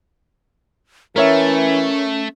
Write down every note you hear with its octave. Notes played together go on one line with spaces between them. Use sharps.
E3 A3 C#4 A#4 C#5 E5